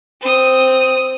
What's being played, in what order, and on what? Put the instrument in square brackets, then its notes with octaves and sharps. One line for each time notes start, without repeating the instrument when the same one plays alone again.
[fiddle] C4 D#6